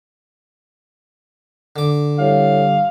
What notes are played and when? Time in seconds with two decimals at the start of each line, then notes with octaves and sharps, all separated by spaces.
1.76 D3 D6
2.19 A2 G3 F5